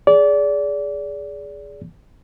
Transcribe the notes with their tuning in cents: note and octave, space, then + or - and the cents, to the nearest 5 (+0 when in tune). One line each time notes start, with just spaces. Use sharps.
G#4 +0 D5 -25